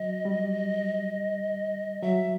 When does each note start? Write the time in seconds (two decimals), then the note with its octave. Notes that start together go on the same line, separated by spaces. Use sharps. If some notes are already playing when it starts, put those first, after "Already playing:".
Already playing: F#3 D#5
0.25 G3
2.02 F#3 E5